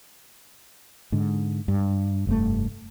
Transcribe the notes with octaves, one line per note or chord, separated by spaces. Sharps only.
G#2 D3
G2
F1 G2 A#2 A3